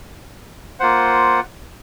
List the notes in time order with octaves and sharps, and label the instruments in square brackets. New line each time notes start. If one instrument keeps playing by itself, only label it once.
[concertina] A#3 F4 C5 F#5